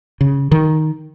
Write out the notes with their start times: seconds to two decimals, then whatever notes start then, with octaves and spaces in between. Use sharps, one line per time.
0.21 C#3
0.52 D#3